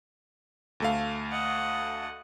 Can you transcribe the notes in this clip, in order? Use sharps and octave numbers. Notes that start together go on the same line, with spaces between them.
D2 A3 F5
D#5 F#5